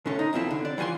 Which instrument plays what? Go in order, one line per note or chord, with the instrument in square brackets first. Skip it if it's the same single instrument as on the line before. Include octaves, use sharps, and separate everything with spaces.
[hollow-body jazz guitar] A2 D3 C#4 A4
D#4
B1 E2 F3 C4 E4 A4
D3
D5
E3 F3 F4 G#5 C6